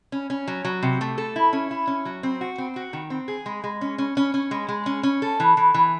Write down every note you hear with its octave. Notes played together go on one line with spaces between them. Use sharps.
C#4
C#4
F#3
F#3
C3
A3
A4
E4
C#4
E4
C#4
F#3
C4
F#4
C4
F#4
D#3
C4
G#4
G#3
G#3
C#4
C#4
C#4
C#4
G#3
G#3
C#4
C#4
A4
E3
E3
E3